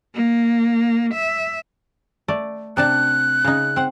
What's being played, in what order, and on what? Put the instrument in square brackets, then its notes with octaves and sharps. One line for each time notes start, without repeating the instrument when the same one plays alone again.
[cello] A#3
E5
[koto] A3 D5
[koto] C3 D4 A5 [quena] F#6
[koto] C#3 D#4
C4 F#5